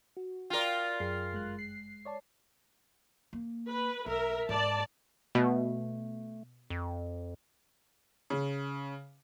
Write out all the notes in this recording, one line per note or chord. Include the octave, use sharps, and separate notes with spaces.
F#4
F4 A#4 D5 G5
F#2 G#4 C7
G1 G#3 F#6
C7
C#5 D5 A5
A#3
B4
B1 A#4 E5
G#2 D5 A5
B2 A3
F2
C#3